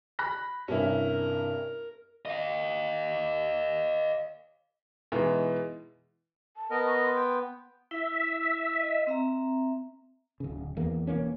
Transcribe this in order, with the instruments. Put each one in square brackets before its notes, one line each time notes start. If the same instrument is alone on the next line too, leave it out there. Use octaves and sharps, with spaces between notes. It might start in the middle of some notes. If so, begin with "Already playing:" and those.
[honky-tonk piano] B5 F#6 A#6
[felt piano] C2 G2 [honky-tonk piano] C#4 E4 [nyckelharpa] A#4
[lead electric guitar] D#5 F5
[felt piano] B2 E3 G#3 D#4 E4
[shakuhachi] A5
[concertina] B3 [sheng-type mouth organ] A#4 D#5
[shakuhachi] C#6
C6
[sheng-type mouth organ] G5
[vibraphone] E4 [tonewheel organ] E5
[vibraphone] D#5
C4 E5 A#5
[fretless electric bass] D1 C#3
E2 A#3
E1 E3 A#3 C#4